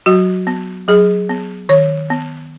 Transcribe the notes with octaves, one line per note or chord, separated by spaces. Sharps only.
F#3 F#4
B3
F#3 G#4
B3
D#3 C#5
B3